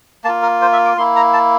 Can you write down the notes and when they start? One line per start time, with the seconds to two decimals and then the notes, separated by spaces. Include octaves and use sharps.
0.24 A#3 A5
0.29 F4
0.42 A#4
0.62 C5
0.73 E5
0.85 D6
0.97 A#3 E4 C6
1.16 A#5
1.33 A5